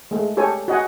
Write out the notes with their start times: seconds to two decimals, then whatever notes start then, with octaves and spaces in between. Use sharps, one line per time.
0.11 G#3 A3
0.37 G4 A4 C#5 G#5
0.68 F#4 D#5 F#5 G#5